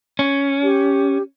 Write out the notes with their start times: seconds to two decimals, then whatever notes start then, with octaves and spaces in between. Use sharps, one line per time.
0.19 C#4
0.63 G4